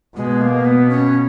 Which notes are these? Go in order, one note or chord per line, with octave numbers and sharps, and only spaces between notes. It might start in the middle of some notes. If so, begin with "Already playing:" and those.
B2 G#3
A#3
B3
C#4